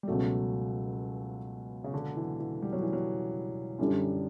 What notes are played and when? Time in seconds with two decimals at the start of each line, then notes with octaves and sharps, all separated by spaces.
0.03 G3
0.08 C#2 B2 F#3 A3
1.84 C#3
1.94 D3
2.16 E3
2.40 E3
2.62 G3
2.73 F#3
2.82 E3
2.93 F#3
3.79 F#2 D3 G3 D4